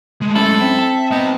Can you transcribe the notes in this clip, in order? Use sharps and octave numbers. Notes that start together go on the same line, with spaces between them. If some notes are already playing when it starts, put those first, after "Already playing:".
G#3 A3
F#2 E4 A4
C4 E5
A5
F#3 B3 D#4